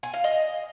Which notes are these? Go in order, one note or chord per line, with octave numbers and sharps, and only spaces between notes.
G#5
F5
D#5